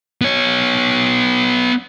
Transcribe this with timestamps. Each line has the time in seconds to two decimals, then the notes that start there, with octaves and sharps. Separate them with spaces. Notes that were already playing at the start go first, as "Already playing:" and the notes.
0.21 B3 C#5